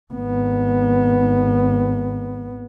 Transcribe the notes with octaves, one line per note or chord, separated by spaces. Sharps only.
G#1 B3